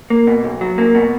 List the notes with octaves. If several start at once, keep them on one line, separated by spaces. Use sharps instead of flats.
A#3
B2
B1
F#3
A#3
B2